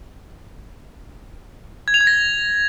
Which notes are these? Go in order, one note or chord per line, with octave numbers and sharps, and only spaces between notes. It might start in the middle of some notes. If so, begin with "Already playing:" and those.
G#6
F7
G#6
A#6